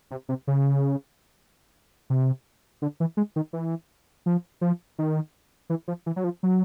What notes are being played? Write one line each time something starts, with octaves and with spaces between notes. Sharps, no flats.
C3
C3
C#3
C3
D3
E3
G#3
D#3
E3
F3
F3
D#3
E3
F3
E3
F#3
F3
F#3